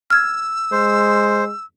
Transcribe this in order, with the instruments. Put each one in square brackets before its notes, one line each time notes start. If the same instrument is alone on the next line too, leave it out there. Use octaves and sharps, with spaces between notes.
[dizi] E6 [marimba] F6 G#6
[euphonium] G#3 [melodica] C5